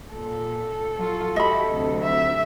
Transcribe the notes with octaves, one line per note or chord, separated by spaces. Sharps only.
A#2 A4
F#3 F4
E4 F#4 G4 D#5 B5
D2 C3 F#3
E5